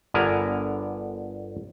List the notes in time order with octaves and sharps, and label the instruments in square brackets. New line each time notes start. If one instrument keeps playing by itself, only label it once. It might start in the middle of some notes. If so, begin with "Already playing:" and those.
[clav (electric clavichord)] G1 D3 B3 A#4 G#5